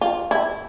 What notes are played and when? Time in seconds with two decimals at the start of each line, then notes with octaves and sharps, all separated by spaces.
0.01 F4
0.31 E4